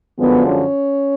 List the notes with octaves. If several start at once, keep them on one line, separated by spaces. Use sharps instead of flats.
F#2 D3 F3 G#3 B3
C#4